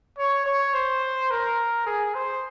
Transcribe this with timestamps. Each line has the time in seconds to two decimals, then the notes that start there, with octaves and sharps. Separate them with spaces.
0.18 C#5
0.46 C#5
0.74 C5
1.31 A#4
1.86 G#4
2.14 C5